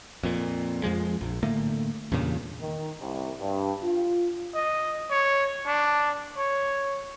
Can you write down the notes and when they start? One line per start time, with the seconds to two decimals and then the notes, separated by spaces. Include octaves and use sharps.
0.23 F2 A#2
0.83 F2 F3 G#3
1.21 A#1
1.43 A2 D3 A3 A#3
2.12 E2 G2 A#2 C#3
2.61 D#3
3.00 C2
3.41 G2
3.84 F4
4.55 D#5
5.10 C#5
5.66 D4
6.38 C#5